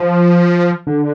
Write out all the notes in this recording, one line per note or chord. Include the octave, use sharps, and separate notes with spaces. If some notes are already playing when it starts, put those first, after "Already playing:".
Already playing: F3
D3